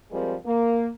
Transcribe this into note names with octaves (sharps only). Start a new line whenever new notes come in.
F3 G3 G#3 C4 A#4
A#3